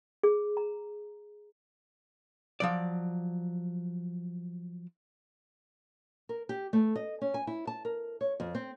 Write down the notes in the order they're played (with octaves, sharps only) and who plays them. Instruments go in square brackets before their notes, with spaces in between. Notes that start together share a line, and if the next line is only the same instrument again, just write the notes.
[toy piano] G#4
A#5
[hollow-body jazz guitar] F3 F#3 D5
[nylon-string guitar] A#4
G4
A3
D#5
C#4
G#5
E4
A5
A#4
C#5
F2
C4